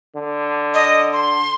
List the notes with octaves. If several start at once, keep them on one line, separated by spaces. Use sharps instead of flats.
D3
D#5
C6